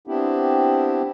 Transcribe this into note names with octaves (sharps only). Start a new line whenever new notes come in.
B3 C4 D4 E4 G4